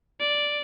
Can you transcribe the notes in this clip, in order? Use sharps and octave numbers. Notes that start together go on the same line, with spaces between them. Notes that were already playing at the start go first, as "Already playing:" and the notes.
D5